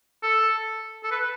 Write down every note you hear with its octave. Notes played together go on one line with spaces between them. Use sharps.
A4
A4
B4